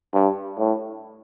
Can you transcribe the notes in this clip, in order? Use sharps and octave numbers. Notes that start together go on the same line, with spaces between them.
G2
A2